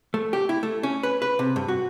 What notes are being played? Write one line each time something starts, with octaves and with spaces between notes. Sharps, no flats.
A3
G4
E4
A3
C#4
B4
B4
C3
G2
F#4